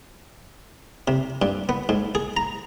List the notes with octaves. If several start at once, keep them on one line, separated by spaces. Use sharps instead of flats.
C3
G2
B3
G#2
G#4
A#5